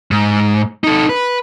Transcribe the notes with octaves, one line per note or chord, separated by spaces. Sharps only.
G#2
D#4 A4
B4